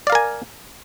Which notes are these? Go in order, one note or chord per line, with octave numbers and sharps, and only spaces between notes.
A#4 D5 F5 G#5